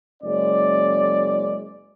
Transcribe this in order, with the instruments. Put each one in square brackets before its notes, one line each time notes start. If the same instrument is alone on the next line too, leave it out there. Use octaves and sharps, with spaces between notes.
[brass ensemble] F#1 G#3 C#4 D5